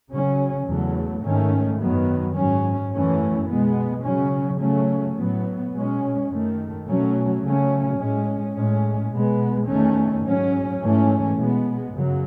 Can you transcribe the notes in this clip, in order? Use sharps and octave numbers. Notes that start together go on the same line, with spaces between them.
C#3 F#3 C#4
E2 C#3 F#3 A3
G#2 D#3 A3 C#4
F#2 D#3 F#3 B3
G#2 F#3 C#4
F#2 E3 A3 C#4
B2 G#3 B3
C#3 F#3 C#4
C#3 F#3 A3 C#4
A2 F#3 B3
B2 G#3 C#4
F#2 D#3 A3
B2 F#3 A3 C#4
C#3 F#3 A3 C#4
A2 G#3 C#4
A2 G#3 C#4
B2 G#3 B3
E2 D#3 A3 C#4
G#2 F#3 C#4
G#2 E3 A3 C#4
B2 G#3 B3
F#2 C#3 F#3